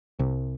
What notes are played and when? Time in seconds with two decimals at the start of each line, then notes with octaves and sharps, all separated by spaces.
0.19 C2